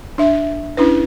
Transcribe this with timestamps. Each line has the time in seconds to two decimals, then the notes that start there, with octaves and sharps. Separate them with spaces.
0.18 D4 E5
0.77 C#4 D4 E4 B4